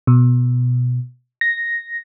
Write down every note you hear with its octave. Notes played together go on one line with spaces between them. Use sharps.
B2
A#6